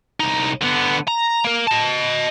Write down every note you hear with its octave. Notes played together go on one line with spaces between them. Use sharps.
C2 D#4
D3 B3
A#5
A#3 A#4
D#5 A5